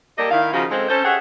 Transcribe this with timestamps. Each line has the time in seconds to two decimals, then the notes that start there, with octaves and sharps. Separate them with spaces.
0.17 G3 A#3 G4 A4 D5 D#5
0.31 D#3 E4 F5
0.54 C#3 F3 D#4 F4 F#4
0.71 G#3 C4 A4
0.88 C#4 A4 C5
1.04 G4 G#4 C#5 E5 F#5